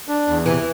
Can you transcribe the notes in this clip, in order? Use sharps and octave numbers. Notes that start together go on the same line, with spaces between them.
D4
E2
C3 E3